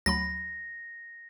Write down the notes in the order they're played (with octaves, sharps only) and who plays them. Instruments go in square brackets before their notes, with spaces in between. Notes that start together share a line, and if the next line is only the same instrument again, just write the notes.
[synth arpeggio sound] D2 F#3 B5 [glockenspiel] A#6